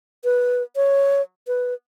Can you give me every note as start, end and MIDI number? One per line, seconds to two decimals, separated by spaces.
0.24 0.63 71
0.76 1.22 73
1.47 1.74 71